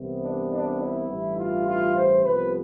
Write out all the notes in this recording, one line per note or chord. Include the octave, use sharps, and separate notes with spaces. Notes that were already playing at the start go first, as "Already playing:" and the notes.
Already playing: C2 C3 E3 B3
D4
D4
E4
A1 G2 E3 G3
F4
F4
C5
C2 C3 F3 B3 B4